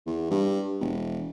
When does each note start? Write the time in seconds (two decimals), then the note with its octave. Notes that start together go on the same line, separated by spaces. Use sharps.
0.06 E2
0.31 G2
0.81 E1